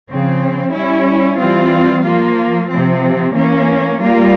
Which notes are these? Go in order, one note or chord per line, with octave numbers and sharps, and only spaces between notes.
C#3 F3 C4
G3 C#4 E4
E3 G3 C4 F4
F3 A#3 F4
C3 F3 C4
E3 A#3 C#4
G3 A#3 F4